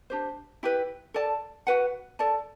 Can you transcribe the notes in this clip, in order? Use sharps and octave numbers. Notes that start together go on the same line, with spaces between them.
D4 G4 C5
E4 G4 B4
A4 D5 A5
F#4 B4 F#5
A4 D5 A5